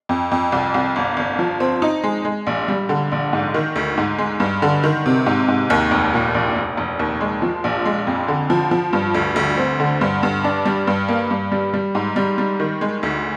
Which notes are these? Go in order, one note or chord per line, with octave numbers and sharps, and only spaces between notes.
F2
F2
C2
C2
G1
G1
F3
C4
D#4
G#3
G#3
A#1
G3
D3
A#1
G#2
D#3
D2
G#2
G#3
G2
D3
D#3
C3
G#2
G#2
D#2
F1
A#2
A#1
F1
F1
D#2
G#3
F3
A#1
G#3
F2
D3
F3
F3
G2
D2
D2
C4
D3
G2
G2
D4
G3
G2
A#3
G2
G3
G3
G#2
G3
G3
D#3
G#3
D2